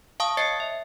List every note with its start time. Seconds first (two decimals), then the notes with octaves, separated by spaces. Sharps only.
0.20 F5 A5 C#6 D#6
0.37 C#5 D#5 A6 C7 C#7
0.60 E5